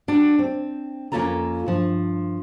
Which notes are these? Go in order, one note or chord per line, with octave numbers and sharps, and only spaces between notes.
G3 D4 F#4
C4
F2 A#3 C#4 F4 A4 A#5
G2 F3